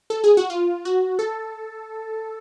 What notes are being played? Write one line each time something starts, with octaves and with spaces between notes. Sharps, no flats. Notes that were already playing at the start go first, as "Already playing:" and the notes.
A4
G#4
F#4
F4
F#4
A4